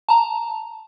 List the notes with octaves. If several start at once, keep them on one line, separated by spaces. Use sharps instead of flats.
A5 A#5